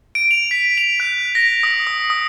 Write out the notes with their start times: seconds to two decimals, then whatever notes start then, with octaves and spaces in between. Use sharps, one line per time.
0.15 D7
0.31 F7
0.51 B6
0.78 F7
1.00 F#6
1.35 A#6
1.63 D#6
1.87 D#6
2.10 D#6